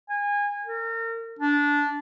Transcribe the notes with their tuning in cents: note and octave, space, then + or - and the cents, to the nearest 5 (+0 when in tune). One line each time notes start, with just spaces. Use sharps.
G#5 -25
A#4 -35
D4 -15